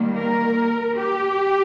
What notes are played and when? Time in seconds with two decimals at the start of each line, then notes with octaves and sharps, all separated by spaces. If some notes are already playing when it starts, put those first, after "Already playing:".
Already playing: D#3 G3 A#3
0.17 A#4
0.98 G4